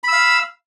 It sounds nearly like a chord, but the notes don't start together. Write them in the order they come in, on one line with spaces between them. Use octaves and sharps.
B5 E6 F5